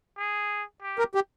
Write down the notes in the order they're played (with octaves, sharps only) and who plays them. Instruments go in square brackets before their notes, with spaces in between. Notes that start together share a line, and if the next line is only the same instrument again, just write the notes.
[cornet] G#4
G4
[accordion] A#4
G4